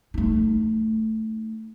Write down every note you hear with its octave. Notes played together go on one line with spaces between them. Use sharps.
A3 D#4